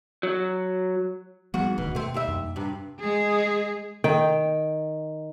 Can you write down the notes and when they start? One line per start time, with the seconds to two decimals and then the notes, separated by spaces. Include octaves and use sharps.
0.23 F#3
1.54 G#2 F3 G3 B3 F#4
1.78 D#1 D2 B2 D#3
1.95 B2 A3 C4
2.14 D#2 G3 E5
2.28 F2
2.56 G2 C3
3.00 G#3 G#4
4.04 D#3 G5